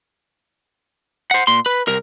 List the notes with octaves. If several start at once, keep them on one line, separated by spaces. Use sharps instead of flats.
C5 F#5
A#2 C6
B4
C2 A#4